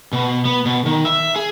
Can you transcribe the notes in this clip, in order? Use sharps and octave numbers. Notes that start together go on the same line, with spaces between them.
B2
B3
B2
D#3
E5
G#4